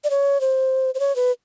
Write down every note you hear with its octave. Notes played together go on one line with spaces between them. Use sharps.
D5
C#5
C5
C5
C#5
B4